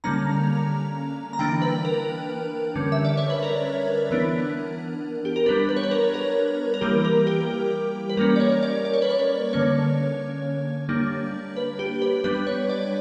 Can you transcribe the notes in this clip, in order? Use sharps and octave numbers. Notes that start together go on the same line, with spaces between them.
D3 G3 A#3 C#4 A#5
A#5
E3 A#3 D4 G5
B4
A#4
D3 G3 C#4
E5
D5
C#5
B4
A#4
E3 B3 D4
G4
A#4
G3 B3 D4 B4
B4
C#5
B4
A#4
A#4
A#4
E3 G3 A#3 G4
A#4
G4
B4
G3 A#3 C#4 A#4
D5
C#5
D5
D5
C#5
B4
C#5
B4
D3 A#3 C#4 C#5
G3 A#3 D4
B4
G4
B4
G3 B3 D4 B4
C#5
D5